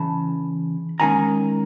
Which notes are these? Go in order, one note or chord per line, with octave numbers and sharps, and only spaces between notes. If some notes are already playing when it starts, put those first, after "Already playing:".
Already playing: C#3 E3 A5 B5
D#2 D#3 G#3 C#4 G#5 A#5